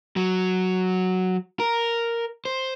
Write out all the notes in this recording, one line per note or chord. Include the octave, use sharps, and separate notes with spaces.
F#3
A#4
C5